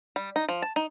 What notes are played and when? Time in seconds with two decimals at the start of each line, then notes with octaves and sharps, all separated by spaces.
0.16 G3
0.36 D#4
0.49 F3
0.62 A5
0.76 D#4